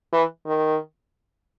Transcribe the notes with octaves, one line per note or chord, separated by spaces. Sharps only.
E3
D#3